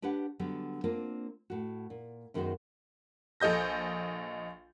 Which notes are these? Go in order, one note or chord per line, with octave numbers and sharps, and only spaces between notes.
D4 G4 B4 C#5 F#5
D3 F#3 G3 B3
A#3 C4 D4 F4 A#4
A2 F#4
A#2
F#2 D#3 G#3 B3 F#4 C5
A#1 A4 D#5 G6 A#6